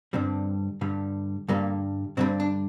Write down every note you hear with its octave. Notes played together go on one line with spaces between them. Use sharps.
G2 D3 G3 C4
G2 D3 G3
G2 D3 G3 A#3
G2 D3 G3 C4
D4